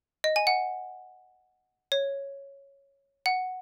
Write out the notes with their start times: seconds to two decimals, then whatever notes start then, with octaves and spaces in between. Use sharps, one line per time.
0.24 D#5
0.36 G#5
0.47 F#5
1.92 C#5
3.26 F#5